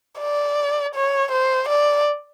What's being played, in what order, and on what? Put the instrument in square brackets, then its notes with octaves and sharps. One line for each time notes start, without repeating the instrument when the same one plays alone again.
[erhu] D5
C#5
C5
D5